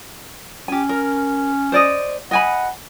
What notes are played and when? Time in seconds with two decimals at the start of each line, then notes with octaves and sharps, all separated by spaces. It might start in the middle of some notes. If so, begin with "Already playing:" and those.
0.68 C#4 G4 G#5
0.89 A#4
1.72 C5 D5 D#5
2.31 D#5 F#5 G#5 B5